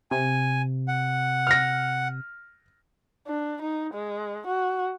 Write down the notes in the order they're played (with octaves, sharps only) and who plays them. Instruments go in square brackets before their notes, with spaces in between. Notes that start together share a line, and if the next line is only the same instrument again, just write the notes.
[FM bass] C3 [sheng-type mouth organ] G#5
[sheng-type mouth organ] F#5
[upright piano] F6 A#6
[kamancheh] D4
D#4
G#3
F#4